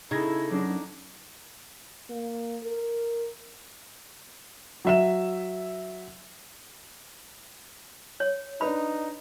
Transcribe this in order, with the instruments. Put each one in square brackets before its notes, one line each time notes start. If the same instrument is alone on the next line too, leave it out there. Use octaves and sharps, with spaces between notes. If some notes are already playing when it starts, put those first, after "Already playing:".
[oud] C#3 [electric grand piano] D#4 G#6 A#6 [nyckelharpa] E4 A4
[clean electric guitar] F#2 [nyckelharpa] D4
[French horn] A#3
A#4
[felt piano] F#3 E5 E7
[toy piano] C#5
[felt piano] D4 B4 [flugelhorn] D#4 [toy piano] B5